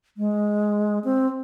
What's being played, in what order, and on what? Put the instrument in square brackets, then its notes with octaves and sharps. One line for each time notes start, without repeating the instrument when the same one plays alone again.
[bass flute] G#3
C4